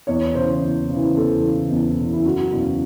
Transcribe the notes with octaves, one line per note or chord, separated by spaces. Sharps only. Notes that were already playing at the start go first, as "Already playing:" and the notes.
E2 C#5
C#3 E3 C5
E2
C#3 E3
E2 A4
C#3 E3
E2
C#3 E3
E4
F#1 F#4
E2 C#3